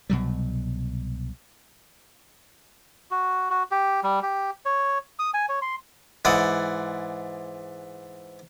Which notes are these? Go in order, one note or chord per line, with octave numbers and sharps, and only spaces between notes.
C2 B2 F#3 G3
F#4
F#4
G4
G3
G4
C#5
D#6
G#5
C#5
C6
G#2 E3 D5 F#5 D#6